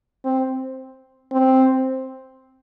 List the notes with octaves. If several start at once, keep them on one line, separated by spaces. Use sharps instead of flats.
C4
C4